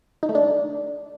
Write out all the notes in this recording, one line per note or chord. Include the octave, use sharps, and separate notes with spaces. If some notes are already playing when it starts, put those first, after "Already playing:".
D#4
A3
D4